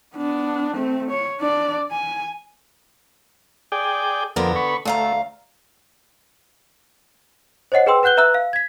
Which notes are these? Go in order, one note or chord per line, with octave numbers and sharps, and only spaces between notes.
B3 D4
A3 C4
C#5
D4 D5
G#5
G#4 D5 G5
F2 D3 B3 A#4
B5 C#6
D2 A3 F5 A#5
C5 C#5 D#5 F#5 C7
G#4 B4 G5 C6 E6
B4 F#5 F#6 G6 G7
B4 E5 A#5 E6 F#6
F5
G#6 B6